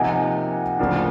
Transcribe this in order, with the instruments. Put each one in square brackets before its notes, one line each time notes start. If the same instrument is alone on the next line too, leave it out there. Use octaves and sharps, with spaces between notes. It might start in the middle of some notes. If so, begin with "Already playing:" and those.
Already playing: [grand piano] C3 F3 A#3 D#4 [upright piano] F#5 G#5
[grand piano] D2 C#3 F3 A#3 D4